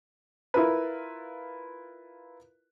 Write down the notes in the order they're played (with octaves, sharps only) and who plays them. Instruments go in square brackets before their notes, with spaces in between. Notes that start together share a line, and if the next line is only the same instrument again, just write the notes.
[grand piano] E4 F4 A#4 B4